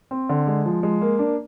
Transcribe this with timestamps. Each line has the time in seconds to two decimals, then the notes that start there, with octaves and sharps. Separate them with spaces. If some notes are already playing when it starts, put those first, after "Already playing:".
0.11 C4
0.29 D3
0.47 G#3
0.66 F3
0.83 G#3
1.01 A#3
1.19 D4